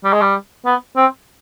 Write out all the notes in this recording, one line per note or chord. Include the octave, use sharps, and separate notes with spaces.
G3
G#3
G3
B3
C4